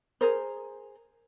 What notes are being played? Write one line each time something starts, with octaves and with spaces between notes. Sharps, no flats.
G#4 A#4 C5